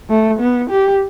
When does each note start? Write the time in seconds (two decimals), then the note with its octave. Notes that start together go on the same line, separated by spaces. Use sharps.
0.10 A3
0.40 B3
0.70 G4